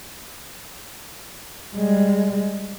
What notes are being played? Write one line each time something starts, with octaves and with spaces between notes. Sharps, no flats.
G3 G#3